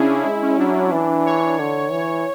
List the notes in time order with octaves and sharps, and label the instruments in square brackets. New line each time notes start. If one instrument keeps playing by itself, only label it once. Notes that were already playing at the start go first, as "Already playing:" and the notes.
Already playing: [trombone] C#3 [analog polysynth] C#4 D4 E4 G#4
[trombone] G#3 [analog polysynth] E4
[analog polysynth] C#4
[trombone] F#3 [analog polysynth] D4
[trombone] E3
[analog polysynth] C#5
[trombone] D3
[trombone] E3 [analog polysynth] C#5